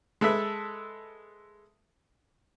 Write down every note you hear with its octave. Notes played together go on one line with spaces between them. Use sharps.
G#3 A4 B4 E5